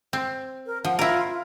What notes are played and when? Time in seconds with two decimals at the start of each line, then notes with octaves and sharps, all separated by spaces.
0.13 C4
0.66 A#4
0.85 F3 F#5
0.99 E4 F4 A#4
1.29 F4